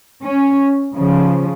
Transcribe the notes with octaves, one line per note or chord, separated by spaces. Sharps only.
C#4
C#3 F3